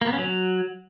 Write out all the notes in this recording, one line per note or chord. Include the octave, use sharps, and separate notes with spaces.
A#3
B3
C#4
F#3